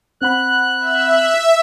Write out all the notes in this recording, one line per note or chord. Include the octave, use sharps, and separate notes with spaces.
C4 F#5 B5 F#6
E5